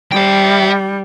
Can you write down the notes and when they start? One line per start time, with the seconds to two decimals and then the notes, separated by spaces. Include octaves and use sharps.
0.12 G3 E5 G5